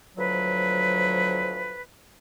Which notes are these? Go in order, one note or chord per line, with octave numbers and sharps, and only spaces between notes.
D2 F3 F#3 B4